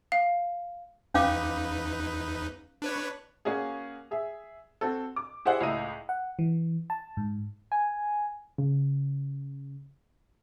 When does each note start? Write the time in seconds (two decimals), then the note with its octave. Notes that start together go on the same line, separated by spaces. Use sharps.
0.12 F5
1.14 E2 C#4 D#4 B4 F5 D6
2.82 D4 B4 C#5
3.45 A#3 C#4 F#4 G#4
4.11 G#4 E5
4.81 C4 F#4 A4
5.16 D6
5.45 E4 G4 G#4 C5 D5 F#5
5.61 C#2 A2 E4 D#5 A#5 D#7
6.09 F#5
6.39 E3
6.90 A5
7.17 G#2
7.72 G#5
8.58 C#3